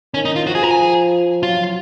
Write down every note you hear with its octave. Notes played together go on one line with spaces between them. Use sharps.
D#3 C#4
D#4
F4
F3 F#4
G#4
A#4
G#4
F#3 F4